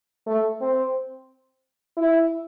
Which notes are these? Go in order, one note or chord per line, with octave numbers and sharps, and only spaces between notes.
A3
C4
E4